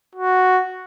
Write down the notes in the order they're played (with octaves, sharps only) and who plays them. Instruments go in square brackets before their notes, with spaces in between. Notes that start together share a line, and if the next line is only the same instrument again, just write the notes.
[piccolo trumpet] F#4